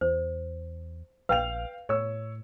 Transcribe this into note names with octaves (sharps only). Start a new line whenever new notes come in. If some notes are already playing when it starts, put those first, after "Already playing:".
E2 C5
A#1 B4 F5 G5 F7
A2 C#5 E6